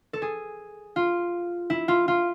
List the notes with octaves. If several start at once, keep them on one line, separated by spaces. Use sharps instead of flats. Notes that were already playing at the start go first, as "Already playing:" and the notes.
A4
G#4
F4
E4
F4
F4